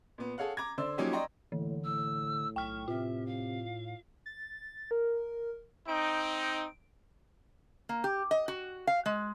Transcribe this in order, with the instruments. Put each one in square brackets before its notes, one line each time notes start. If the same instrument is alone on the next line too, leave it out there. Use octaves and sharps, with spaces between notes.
[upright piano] A#2 B3
G#4 A4 C#5 F5 F#5
A#5 D6 G#6
D3 C5 D5 E6
F3 F#3 A#3 C#4 D#4 G4
D5 D#5 G5 A#5 C6 C#6
[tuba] A2 [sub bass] D3 [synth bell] E3
[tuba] A2 [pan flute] E6
[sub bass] B1 [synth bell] G5 F6 [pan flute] C#6
[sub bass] A2 [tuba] C3 [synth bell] F4 [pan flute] E5
[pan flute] F5
[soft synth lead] A6
A#4
[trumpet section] C4 D#4 [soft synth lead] D7
[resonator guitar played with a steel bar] A#3
G4
D#5
F#4
F5
G#3